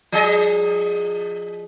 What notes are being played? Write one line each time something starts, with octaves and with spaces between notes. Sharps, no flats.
F3 G#4 D#5